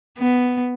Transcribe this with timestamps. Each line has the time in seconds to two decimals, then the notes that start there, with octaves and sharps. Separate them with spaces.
0.18 B3